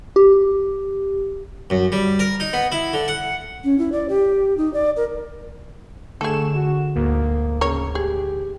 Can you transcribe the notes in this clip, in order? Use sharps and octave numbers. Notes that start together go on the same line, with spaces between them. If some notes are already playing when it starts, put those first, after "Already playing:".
G4
F#2
G3
A#4
D#4
B3
E4
D3
F#5
C#4
E4
D5
G4
D#4
D5
A#4
D3 A3 G#4 A4 C#6 E7
F#4
D2 G#2 A#3
C#3 A#4 C#5
G4 G#4